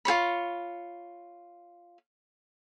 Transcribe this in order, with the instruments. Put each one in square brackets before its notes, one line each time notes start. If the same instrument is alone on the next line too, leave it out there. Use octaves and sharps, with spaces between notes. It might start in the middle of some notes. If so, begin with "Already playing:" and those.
[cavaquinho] F4 G#4 C#5 B5